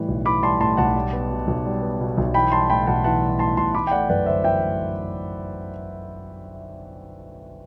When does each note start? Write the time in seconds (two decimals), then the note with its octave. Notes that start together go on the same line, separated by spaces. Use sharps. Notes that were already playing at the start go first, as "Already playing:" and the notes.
Already playing: A2 E3 G3
0.08 B1
0.26 E3 B5 D6
0.42 G3 A5 C6
0.60 A2 A5 C6
0.77 B1 F#5 A5
0.95 G3
1.13 B3
1.30 B2
1.47 B1
1.65 G3
1.82 B3
2.00 B2
2.17 B1
2.34 E3 G5 B5
2.52 G3 A5 C6
2.70 A2 G5 B5
2.87 B1 F#5 A5
3.04 E3 F#5 A5
3.21 G3
3.39 A2 A5 C6
3.57 B1 A5 C6
3.74 E3 B5 D6
3.87 G5
3.91 A3 D5 F#5
4.09 F#2 B4 D5
4.26 G1 C5 E5
4.44 E3 E5 G5
4.62 A3